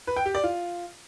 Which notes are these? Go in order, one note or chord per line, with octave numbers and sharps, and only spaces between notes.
B4
G5
G4
D5
F4